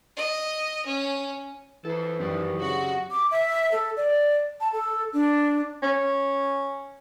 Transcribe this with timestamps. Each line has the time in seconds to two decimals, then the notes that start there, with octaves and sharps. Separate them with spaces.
0.16 D#5
0.86 C#4
1.85 E3 A4 C5
2.19 F#2 D#3 C4 G4 D5
2.61 C#3 F#4
3.10 D6
3.31 E5
3.71 A4
3.96 D5
4.60 A5
4.72 A4
5.13 D4
5.83 C#4